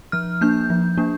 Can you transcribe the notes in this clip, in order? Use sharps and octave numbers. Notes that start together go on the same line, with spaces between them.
F3 F6
A#3 D4 G6
F3
A#3 D4